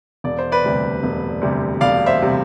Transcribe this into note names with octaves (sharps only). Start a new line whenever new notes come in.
E1 D5
C5
B4 D5
D2 C3 G3
E1
D2 C3 G3
E1 D5 F5
C5 E5
C3 G3